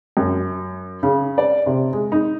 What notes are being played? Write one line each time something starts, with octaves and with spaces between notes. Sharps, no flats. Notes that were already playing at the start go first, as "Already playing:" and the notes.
F#2
C#3
D5
C3
G#3
D#4